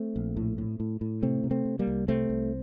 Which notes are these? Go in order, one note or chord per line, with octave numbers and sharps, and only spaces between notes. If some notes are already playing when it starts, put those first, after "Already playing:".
Already playing: A3 C4
A#1
A2
A2
A2
A2
C3 A3 C4
C3
A3 C4
C3
G3 A#3
C2
C3 A3 C4
C2